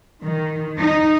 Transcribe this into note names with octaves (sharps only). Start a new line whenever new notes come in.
D#3
D#4